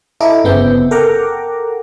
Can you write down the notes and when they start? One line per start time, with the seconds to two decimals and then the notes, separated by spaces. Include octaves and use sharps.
0.21 E4 A4 D#5 A#5 D6
0.44 G1 C#3 B3 C4 E5 G6
0.91 A4 A#4 F#5 G5 A#5 D6